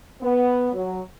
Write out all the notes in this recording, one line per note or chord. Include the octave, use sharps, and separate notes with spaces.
B3
F#3